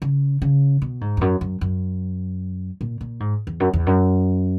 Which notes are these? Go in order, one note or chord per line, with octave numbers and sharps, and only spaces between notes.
C#3
C#3
B2
G#2
E2
F#2
F#2
F#2
A#2
A#2
G#2
E2
F#2
E2
F#2